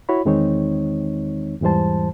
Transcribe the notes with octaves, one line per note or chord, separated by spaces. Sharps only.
E4 F#4 C#5 B5
E2 D#3 G#3 C4 D#4 C#5
E2 G#2 E3 G3 C5 A5